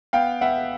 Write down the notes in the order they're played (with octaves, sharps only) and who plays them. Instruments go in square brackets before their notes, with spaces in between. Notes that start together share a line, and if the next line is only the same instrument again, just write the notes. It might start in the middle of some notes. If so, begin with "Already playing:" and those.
[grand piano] B3 F5 G5
B3 E5 F#5